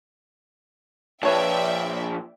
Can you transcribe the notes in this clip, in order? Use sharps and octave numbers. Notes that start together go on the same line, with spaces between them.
A#2 F3 B4 C#5 D5 E5 G5 A5